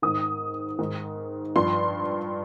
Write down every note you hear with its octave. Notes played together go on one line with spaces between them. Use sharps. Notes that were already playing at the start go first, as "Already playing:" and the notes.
G#2 D#3 D#6
G#2 D#3
G2 F3 C6